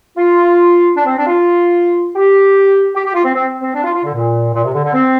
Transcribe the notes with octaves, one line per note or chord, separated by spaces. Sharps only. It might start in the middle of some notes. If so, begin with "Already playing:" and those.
F4
D4
C4
D4
F4
G4
G4
G4
F4
C4
C4
C4
D4
F4
F4
D3
A#2
A#2
C3
D3
D3
C4